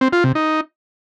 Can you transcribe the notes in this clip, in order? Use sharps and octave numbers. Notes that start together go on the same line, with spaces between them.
C4
F4
C3
D#4